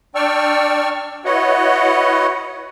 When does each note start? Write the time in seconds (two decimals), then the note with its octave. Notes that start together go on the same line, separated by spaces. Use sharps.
0.15 D4 D5 G5 C#6 E6 F6
1.25 E4 F#4 B4 C#5 D#5 F#5